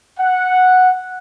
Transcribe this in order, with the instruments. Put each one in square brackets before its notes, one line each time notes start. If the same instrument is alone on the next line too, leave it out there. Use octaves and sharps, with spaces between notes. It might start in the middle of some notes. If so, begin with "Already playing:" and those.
[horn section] F#5